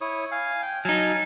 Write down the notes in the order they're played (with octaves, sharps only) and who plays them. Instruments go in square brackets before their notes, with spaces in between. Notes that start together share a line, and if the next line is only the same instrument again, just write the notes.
[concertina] E4 C#5 D#6
F5 G#5
G5
[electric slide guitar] F#3 D#4 [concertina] G#5 A5 F6